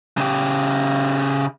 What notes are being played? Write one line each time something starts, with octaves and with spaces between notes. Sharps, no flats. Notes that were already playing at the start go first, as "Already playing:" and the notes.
C#3 G4